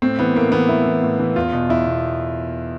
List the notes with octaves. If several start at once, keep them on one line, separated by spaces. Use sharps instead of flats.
A2 C4
E3 B3
A2 A#3
E3 B3
A2 E4
E3
A2
E3
E2 F4
B2
E2 E4
B2